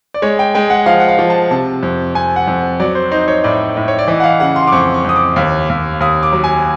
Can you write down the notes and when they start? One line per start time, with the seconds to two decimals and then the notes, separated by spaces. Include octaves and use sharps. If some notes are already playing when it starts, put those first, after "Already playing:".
0.14 D5
0.22 G#3 C#5
0.39 G5
0.55 G#3 G5
0.70 F#5
0.86 F3 F5
1.00 F#5
1.09 F5
1.19 F3
1.30 A5
1.51 C3 A5
1.83 F2
2.15 F2 G#5
2.36 F#5
2.47 F2
2.80 F#3 D5
2.95 C5
3.11 D#4 C5
3.28 C#5
3.44 A2 D5
3.77 A2
3.88 C#5
3.99 D5
4.08 E3 D#5
4.20 F#5
4.24 F5
4.40 C#3 F#5
4.56 C6
4.67 D6
4.72 F2 C#6
4.94 C#6
5.04 F2 D#6
5.16 D6
5.36 D#2
5.69 D#2
6.00 D#2 D#6
6.23 D6
6.33 F#3
6.44 G#5